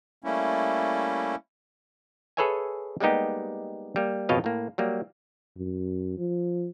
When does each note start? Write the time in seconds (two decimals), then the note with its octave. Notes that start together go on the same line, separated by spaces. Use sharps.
0.24 G3 A3 A#3 C#4 E4
2.37 G#4 A4 B4 C#5 E5 G#5
3.00 G3 G#3 A#3 B3 D#4 G4
3.96 G3 A#3
4.29 G#1 F2 B2 C#5 D#5 F5
4.44 A2 A#3
4.78 F#3 G3 A#3
5.57 F#2
6.18 F3